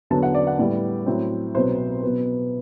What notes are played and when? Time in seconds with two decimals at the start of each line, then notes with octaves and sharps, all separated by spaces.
0.10 E2 D3 F#3 B3 A5
0.23 F#5
0.35 D5
0.47 F#5
0.58 A2 G3 B3 D5
1.06 A2 F#3 C4
1.55 C2 B2 F#3 B3 C5
2.03 B2 F#3 B3